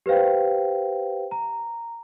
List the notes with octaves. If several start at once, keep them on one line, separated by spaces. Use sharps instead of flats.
G4 B4 C5 F5 G5
A#5